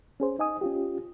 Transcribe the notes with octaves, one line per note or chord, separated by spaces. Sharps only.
C#4 G#4 C5
D#4 D#5 G#5 D#6
C#4 F4 G4